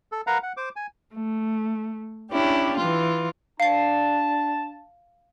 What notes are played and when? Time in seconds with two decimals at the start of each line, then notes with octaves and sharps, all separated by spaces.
0.12 A4
0.27 A#4 B4 F5 F#5 A#5
0.43 F#5
0.57 C5 D6
0.76 G#5
1.13 A3
2.31 C#4 D4 E4 G4
2.77 E3 F4
3.60 D4 F5 A5 C7